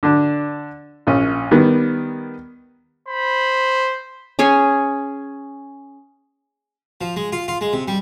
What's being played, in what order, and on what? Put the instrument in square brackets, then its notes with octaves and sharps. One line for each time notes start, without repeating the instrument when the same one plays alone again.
[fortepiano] D3 D4
A#1 C#4
D#3 G3 B3
[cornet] C5 [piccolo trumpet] B5
[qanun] C#4 G#4 C#5 G#5
[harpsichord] F3
G#3
F4
F4
G#3
C3
G3